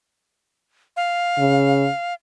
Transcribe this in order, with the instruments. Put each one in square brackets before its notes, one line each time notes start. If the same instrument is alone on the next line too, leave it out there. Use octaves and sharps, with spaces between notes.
[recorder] F5
[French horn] C#3